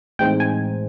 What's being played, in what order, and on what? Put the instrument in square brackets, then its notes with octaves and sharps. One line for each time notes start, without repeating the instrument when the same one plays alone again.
[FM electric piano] A2 E3 G#3 C4 D#4 G5
G#5